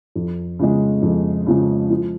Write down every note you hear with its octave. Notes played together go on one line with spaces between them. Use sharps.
F2
C#3 F3 G#3
F2
C#3 F3 G#3
F3